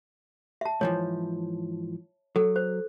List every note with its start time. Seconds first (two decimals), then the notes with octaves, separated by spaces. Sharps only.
0.61 E5 A5
0.81 G#2 E3 F3 C#5
2.36 F#3 A4
2.56 C5